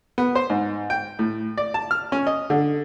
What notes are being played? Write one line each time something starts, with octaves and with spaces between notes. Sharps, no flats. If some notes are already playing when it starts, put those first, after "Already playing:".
B3
C5
G#2
G5
A2
D5
A5
F6
C#4
D#5
D3